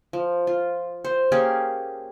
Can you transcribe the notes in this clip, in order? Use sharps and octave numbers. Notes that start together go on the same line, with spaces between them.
F3
F4
C5
A#3 C#4 G4 G#4